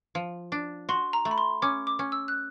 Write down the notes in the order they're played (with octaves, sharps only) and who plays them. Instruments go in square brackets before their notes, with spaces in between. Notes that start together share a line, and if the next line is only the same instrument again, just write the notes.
[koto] F3
D4
[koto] F#4 [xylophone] C6
[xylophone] A#5
[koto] A3
[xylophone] B5
C6
[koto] C#4 [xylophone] D6
[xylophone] D6
[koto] C#4
[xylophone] E6
F#6